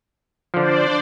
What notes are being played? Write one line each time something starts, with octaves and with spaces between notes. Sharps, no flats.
D3 F3 D4 C5 D5